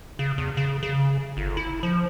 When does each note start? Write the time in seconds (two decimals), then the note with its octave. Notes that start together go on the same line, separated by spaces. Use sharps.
0.19 C#3
0.38 E2
0.57 C#3
0.83 C#3
1.37 G1
1.57 E4
1.83 F3